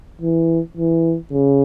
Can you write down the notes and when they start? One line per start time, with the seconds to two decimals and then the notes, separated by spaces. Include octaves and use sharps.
0.21 E3
0.77 E3
1.32 C#3